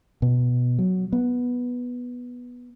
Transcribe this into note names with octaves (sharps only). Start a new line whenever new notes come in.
B2
F#3
B3